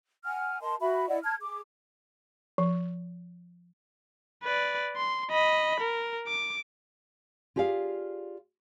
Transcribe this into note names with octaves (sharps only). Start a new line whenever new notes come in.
F#5 G#5 F6
A#4 D#5 A5 C6
F#4 E5 B5
E4 D5 D#5 F#5
A5 F6 G#6
G#4 D6
F3
B4 D5
C6
D#5 B5
A#4
D6
F4 G4 G#4 D5 F5